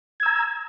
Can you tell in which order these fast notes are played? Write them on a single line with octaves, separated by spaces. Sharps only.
G#6 E6 A#5